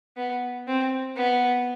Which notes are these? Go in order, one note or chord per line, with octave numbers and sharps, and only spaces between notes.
B3
C4
B3